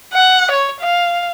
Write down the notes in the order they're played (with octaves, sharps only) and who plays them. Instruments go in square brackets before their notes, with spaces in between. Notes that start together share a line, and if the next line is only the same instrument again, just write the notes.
[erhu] F#5
C#5
F5